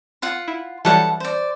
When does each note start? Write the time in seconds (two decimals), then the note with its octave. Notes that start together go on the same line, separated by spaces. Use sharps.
0.22 F4 F#5 C6
0.48 E4
0.85 E3 F#3 G3 A4 F#5 A5
1.20 C5 D5